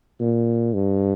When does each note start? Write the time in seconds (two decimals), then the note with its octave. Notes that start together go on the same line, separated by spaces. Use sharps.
0.20 A#2
0.74 G2